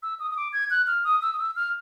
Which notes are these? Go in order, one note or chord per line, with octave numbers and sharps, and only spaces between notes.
E6
D#6
D#6
D6
G#6
F#6
F6
D#6
E6
D#6
E6
F6